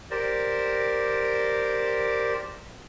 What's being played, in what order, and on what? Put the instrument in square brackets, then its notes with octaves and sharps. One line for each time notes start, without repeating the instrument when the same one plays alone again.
[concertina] G4 A#4 C5 D5